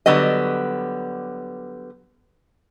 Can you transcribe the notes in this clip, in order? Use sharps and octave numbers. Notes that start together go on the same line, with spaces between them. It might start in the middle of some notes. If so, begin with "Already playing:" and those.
D3 F#3 G3 B3 D#5